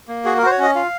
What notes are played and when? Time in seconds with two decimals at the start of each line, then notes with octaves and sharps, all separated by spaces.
0.08 A#3
0.25 F#4 G#4
0.37 A#4
0.42 F#4 C5
0.51 C#5
0.58 C#4 D#5
0.75 F4 F5